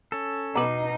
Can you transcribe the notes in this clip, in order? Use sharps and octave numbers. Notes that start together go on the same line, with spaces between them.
C#4 A4
B2 B3 D#4 B4 A#5 D6